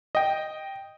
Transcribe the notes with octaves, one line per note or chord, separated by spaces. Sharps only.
D#5 G5